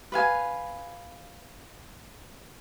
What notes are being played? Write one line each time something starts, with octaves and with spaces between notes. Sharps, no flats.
B4 F5 G#5